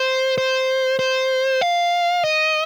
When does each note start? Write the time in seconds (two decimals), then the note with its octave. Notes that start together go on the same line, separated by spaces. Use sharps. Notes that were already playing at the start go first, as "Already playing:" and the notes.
Already playing: C5
0.38 C5
0.99 C5
1.61 F5
2.24 D#5